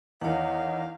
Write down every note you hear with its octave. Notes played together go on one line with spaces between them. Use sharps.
E2 D#3 C#5 D#5 F5 F#5